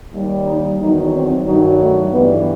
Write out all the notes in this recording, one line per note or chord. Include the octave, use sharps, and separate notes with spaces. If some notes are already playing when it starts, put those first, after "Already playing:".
D#2 D#3 G3
D#4
E2 D#3 F#3 D#4
C4
G2 D#3 F#3 D#4
A3
G2 E3 G3 B3